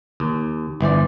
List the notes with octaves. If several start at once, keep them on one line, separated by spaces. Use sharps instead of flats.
D#2
G1 E3 C5 D5